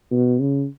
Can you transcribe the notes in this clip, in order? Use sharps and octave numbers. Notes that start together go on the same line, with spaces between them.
B2
C#3